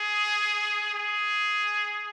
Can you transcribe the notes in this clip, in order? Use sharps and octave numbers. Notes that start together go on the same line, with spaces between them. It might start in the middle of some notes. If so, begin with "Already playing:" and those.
Already playing: G#4
G#4